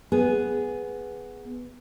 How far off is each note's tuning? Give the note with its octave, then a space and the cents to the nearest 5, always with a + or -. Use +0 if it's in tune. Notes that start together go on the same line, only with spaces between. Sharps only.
B3 +0 G#4 +0